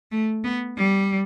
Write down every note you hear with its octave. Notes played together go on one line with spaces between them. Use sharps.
A3
B3
G3